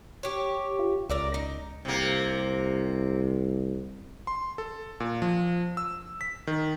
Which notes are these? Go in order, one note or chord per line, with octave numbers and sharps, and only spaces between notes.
G4 C#5
F4
C#2 A#4 D5 E5
D#4
C2 C3 A#3
C6
A4
A#2
F3
E6
B6
D#3